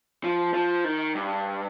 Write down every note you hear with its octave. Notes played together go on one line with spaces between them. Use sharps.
F3
F3
D#3
G2